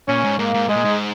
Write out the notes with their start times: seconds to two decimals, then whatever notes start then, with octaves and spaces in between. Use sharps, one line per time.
0.08 A#2 C#4
0.24 G#2
0.39 G#2 A#3
0.54 G#2
0.69 G#2 G#3
0.76 A#2
0.85 G#2